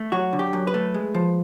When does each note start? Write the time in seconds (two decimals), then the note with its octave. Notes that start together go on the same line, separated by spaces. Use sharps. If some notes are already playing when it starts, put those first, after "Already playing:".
Already playing: A3
0.12 F#3 F#4
0.33 D3
0.39 G4
0.53 F#2
0.67 B4
0.74 A3
0.94 G#3
1.14 F3